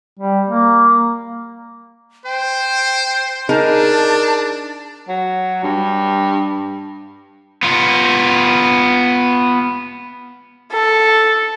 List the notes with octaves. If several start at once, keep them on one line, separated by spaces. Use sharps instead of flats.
G3
A#3
C5 G5
D4 D#4 G#4 A#4 A5
F#3
G2
B3 F4
A4